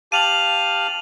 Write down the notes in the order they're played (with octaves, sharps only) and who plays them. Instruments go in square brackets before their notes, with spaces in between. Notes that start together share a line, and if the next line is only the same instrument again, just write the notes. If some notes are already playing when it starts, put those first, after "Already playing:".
[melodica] G4 F5 A5 [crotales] D#7 F7 F#7